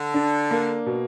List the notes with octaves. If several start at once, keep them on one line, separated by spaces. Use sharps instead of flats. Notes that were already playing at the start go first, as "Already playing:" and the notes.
Already playing: D3
D4
A#3
B2